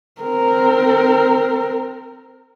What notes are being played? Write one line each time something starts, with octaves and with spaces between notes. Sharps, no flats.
C4 A#4